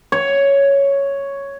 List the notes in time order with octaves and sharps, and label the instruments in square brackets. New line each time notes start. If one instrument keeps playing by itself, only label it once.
[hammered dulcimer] C#5